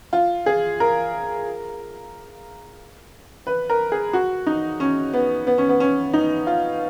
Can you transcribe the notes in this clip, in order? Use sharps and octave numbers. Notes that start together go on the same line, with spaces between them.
F4
G#4
A#4
B4
A#4
G#4
F#4
D#4
C#4
B3
B3
C#4
B3
C#4
D#4
F4